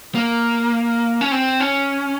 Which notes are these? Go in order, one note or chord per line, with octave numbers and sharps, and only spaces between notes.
A#3
C#4
C4
C#4